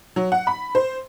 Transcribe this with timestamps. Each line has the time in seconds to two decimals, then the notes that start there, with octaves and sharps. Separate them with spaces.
0.16 F#3
0.32 F#5
0.47 B5
0.75 C5